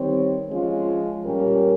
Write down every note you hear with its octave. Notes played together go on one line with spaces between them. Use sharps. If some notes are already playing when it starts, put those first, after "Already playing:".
Already playing: D#3 G3 C4 G4 C#5
F3 G#3 C#4 F4
A#2 G3 C#4 G4 A#4